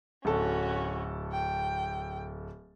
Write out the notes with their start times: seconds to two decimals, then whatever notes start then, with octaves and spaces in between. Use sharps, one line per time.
0.25 D1 C#4 F#4 A4
1.33 G5